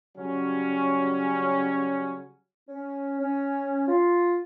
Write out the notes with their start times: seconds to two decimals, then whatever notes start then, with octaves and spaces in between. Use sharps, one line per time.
0.18 C#3 F#3 G3 C#4
2.69 C#4
3.20 C#4
3.88 F4